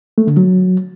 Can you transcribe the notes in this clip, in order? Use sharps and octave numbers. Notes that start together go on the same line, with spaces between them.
A3
D3
F#3